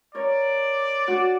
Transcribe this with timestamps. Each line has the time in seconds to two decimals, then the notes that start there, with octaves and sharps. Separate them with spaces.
0.14 A#4 C#5 D5
1.08 D4 F#4